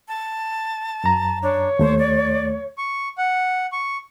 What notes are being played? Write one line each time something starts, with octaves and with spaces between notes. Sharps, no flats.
A5
F#2 A#5
D4 C#5
D#2 A3 C5
D5
C#6
F#5
C#6